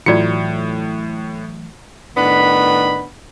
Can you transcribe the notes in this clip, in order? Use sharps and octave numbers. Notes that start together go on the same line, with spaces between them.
A2 E3 F#3 A3 F4 F#4 D5 C#7
A2 D#3 B3 D4 B5